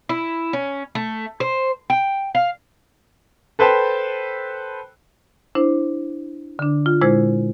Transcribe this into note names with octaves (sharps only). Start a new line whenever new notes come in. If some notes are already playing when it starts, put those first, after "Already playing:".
E4
C#4
A3
C5
G5
F5
A4 B4 C5 G5 A5
D4 E4 C5
D3 D4
F4
A#2 G#3 E4 C5 E6 G#6